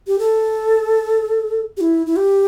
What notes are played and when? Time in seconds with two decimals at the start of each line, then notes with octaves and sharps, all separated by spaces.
0.07 G4
0.19 A4
1.77 G4
1.81 E4
2.06 E4
2.17 G4